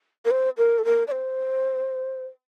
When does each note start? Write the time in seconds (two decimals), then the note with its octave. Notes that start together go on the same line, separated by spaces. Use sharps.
0.25 A#4
0.31 C5
0.57 A#4
0.78 A4
0.85 A#4
1.07 D5
1.11 C5